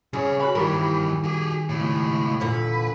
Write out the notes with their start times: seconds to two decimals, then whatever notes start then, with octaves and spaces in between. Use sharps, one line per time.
0.13 C2 C#3 C#5
0.40 F#4 B4 C#5 B5
0.55 G2 D#3 E3 G3 A#4
1.24 G4 G#4
1.69 C#2 A2
2.40 E2 A#2 D3 B4